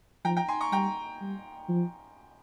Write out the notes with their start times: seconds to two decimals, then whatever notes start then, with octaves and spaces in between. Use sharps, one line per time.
0.25 F3 G5 A#5
0.37 G5 A#5
0.48 G#5 C6
0.61 A#5 C#6
0.72 G3 G5 A#5
1.21 G3
1.69 F3